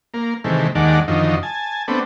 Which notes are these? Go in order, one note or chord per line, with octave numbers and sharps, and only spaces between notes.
A#3
C3 D#3 E3 G#3 A3
D#2 D#3 G#3 D5 F#5 A5
F#2 D3 D#3 F3 D#4
G#5 A5
A3 B3 C4 D4